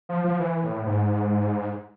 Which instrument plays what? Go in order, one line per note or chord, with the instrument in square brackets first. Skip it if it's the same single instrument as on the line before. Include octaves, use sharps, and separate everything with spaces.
[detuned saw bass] F3
F3
E3
A2
G#2